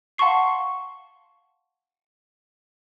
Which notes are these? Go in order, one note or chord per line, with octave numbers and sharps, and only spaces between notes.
F5 F#5 A5 C6 C#6 C7